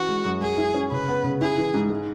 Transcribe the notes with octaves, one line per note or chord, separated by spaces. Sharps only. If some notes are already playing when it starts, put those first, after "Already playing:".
Already playing: E3 C#4 F#4
G#3
F#2
F#3 G#4
E4
C#4
C#3 B4
B3
C#3
E4 G#4
E3
G#2
G#3